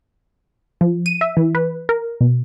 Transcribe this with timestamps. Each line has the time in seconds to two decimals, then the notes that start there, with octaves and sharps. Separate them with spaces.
0.81 F3
1.06 D#7
1.21 E5
1.37 E3
1.55 B4
1.89 A#4
2.21 B2